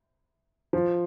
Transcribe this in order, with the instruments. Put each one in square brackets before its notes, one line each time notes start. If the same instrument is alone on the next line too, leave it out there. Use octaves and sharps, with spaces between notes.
[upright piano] F3